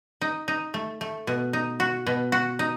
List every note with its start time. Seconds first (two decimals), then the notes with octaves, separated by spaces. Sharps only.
0.21 D#4
0.48 D#4
0.74 A3
1.01 A3
1.27 B2
1.53 D#4
1.80 F#4
2.06 B2
2.32 F#4
2.59 D#4